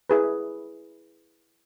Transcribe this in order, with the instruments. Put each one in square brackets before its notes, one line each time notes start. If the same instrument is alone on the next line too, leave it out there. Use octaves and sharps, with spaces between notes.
[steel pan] E4 G#4 B4